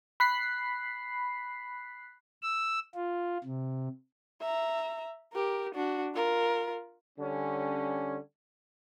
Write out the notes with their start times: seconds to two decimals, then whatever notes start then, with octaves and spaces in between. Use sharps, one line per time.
0.20 B5 F#6 B6 C7
2.42 E6
2.94 F4
3.44 C3
4.41 E5 A#5
5.33 G4 A#4
5.75 D4 F#4
6.14 F4 A#4
7.19 D3 G3 C#4